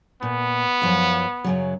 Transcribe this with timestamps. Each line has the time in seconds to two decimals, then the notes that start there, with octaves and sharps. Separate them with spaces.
0.22 A#2 B3
0.82 F#2 F3 F5
1.44 F#2 C#3 F#3